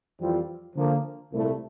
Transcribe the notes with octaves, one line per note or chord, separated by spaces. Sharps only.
F2 E3 G3 C4 F4
D3 F3 A#3
C2 A#2 A3 E4